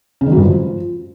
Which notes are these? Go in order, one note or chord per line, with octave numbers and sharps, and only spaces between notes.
C#3
D#3
F#3
G2
F3